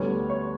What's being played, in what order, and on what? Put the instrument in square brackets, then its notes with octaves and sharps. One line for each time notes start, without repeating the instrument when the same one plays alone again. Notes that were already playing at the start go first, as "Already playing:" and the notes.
Already playing: [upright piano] D2 D3 G3 B3 C#5
C#5